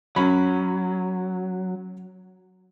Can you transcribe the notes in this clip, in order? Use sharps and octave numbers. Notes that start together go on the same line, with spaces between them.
F#2 F#3 C#4 B5